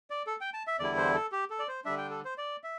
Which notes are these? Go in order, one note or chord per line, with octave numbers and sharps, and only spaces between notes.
D5
A4
G5
A5
E5
E2 D3 G3 E4 D5
C5
A4
G4
A4
D5
C5
D3 G3 D4 E5
G5
A4
C5
D5
E5